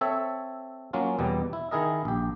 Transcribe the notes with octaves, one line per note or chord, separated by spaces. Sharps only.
C4 A4 C#5 E5
F#3 A#3 C#4 F4
E2 B2 G3
E4
D#3 E4 G#4 A#4 D#5
A#1 G4